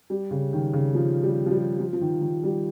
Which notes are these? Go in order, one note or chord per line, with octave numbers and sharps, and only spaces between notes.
G3
C#3
D#3
C#3
F3
G3
F3
G3
F3
F3
D#3
D#3
G3